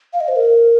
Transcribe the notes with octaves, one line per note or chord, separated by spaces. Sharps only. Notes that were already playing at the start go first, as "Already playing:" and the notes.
F5
D#5
C5
A#4